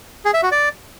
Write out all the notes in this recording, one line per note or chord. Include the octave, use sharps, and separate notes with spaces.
G#4
E5
F#4
D5